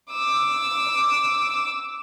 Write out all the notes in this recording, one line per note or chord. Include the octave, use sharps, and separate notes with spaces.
D6 E6